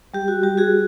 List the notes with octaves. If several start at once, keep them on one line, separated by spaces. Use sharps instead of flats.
G3 G4
F#4
G3 G4
F#4 G#4